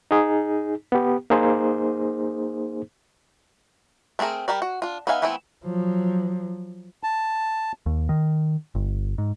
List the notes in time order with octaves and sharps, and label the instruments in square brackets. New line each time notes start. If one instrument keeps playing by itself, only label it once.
[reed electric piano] D#4 G#4
B3 G4
A#3 D#4 G#4 C5
[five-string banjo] A3 C4 F4 G#4 A#4
G3 G4 A#4 D5
F#4
D4 F4
B3 D#4 E5 F5 G#5
E3 A3 B3 C4 E4
[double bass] F3 F#3
[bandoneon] A5
[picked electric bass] D#2
D#3
G1
G#2